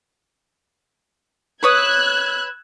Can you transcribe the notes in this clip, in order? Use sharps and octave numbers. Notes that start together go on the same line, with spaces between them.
B4 C#5 D#6 E6 F#6 G#6